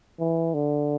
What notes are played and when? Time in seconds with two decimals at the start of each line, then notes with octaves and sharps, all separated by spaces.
0.20 E3
0.54 D3